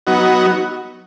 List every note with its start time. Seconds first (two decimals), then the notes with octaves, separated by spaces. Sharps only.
0.07 F#3 B3 D#4 F#4